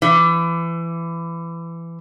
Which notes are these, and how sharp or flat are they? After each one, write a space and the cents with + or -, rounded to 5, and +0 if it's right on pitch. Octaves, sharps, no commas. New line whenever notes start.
E3 +25